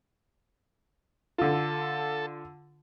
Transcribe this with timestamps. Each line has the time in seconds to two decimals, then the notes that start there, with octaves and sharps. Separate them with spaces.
1.38 D3 F4 A4